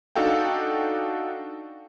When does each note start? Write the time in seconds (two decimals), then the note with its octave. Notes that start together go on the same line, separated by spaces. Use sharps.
0.16 D4 D#4 F#4 A4 F5 G5